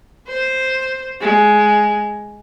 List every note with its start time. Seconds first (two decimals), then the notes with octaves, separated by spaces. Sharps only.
0.28 C5
1.21 G#3